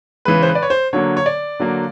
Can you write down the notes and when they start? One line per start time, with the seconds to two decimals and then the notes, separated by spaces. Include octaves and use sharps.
0.25 C#3 E3 G#3 B4
0.43 C5
0.48 B4
0.55 D5
0.62 C#5
0.70 C5
0.93 D3 F#3 A#3 C#5
1.17 C#5
1.26 D5
1.59 D3 F#3 A#3